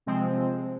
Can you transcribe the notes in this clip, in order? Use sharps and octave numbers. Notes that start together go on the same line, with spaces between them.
C3 F3 G#3 C4